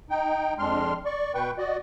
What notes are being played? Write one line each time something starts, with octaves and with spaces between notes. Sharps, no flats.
D#4 G5
F2 G#3 C4 D4 C6 F6
D5 C#6
B2 B4 G5 C#6
F#4 D5 D#5